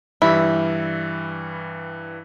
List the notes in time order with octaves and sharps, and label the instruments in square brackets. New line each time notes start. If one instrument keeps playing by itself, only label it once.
[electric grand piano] G2 E3 G3 [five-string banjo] E4